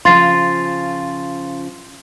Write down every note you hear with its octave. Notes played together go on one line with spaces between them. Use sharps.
C#3 F3 F4 C6 A6 C7